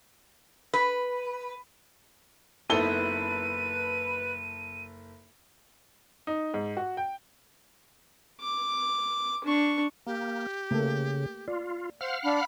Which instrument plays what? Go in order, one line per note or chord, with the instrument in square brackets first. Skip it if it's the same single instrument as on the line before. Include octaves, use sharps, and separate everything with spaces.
[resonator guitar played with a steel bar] B4
[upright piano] F#1 A4 G7 [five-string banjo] B3 D#4 E4 [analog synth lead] B4 [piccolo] D#7
[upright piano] D#4
G#2
F#4
G5
[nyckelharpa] D6
D4 C#6
[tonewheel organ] A#3 [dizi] G4
[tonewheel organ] C#3 [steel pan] A3 A#3 A4
[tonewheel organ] F4 [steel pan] D5
[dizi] C5 [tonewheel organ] F5 F#5 F6
[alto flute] D4 [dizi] B5